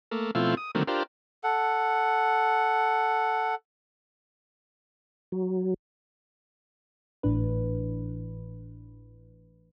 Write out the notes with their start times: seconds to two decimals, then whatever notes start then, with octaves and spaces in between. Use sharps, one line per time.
0.11 A3 A#3
0.35 B2 F3 A3 C4 E4 F4
0.57 D#6
0.75 D3 D#3 F#3 A3 A#3 C4
0.87 D4 F4 G4 A#4 C5
1.44 A4 F#5
5.32 F#3
7.23 G#1 A2 E3 D4 B4